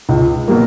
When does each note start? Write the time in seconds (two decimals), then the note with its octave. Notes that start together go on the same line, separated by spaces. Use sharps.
0.09 C#2
0.48 B2 F#3 A#3